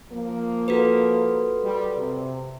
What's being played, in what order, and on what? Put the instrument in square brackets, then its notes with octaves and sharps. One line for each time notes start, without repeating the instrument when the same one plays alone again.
[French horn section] F3 A#3
[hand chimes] F#4 A4 B4
[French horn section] G3
C3